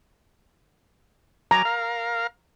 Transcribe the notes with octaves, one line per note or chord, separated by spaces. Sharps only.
F#3 G#5 A#5 D6
A#4 F5